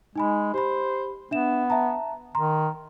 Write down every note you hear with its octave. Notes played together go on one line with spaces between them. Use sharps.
G#3 D#4 G#5 B5
G4 C5 B5
B3 D4 E5 E7
E5 A5 A#5
D#3 A#5 C6